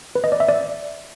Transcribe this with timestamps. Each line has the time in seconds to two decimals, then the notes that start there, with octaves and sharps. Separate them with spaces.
0.15 B4
0.24 D#5
0.32 D5
0.40 E5
0.48 D5